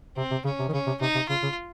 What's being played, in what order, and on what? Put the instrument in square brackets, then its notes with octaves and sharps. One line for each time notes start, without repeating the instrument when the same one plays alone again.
[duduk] C3 [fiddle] C4
[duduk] C3
[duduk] C#3 [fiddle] C#4
[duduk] C3
D#3
[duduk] C#3 [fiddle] C#4
[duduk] C3
[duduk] C3 [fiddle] D#4
[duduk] C3
[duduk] C#3 [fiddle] F4
[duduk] C#3